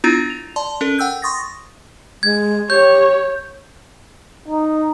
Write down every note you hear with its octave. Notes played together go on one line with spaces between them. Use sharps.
B3 D4 E4 F4 A#5
F7
D5 A5 C6
C#4 A4 A#4
F#5 G5 E6 G6
C6 C#6 D#6 A6 A#6
G#3 G#6
G4 C#5 G6
D#4